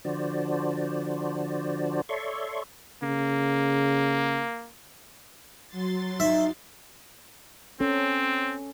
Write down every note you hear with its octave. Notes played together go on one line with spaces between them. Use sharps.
D3 F3 D4 F#4 C5 D5
A4 C#5 D5 E5 C6 C#6
C#3 A#3
F#3 C6 A6
D#4 E5
C4 C#4 A4